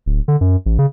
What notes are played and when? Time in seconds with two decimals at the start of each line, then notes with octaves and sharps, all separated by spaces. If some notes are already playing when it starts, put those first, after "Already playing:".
0.06 D1
0.28 D3
0.41 F#2
0.66 A1
0.79 C#3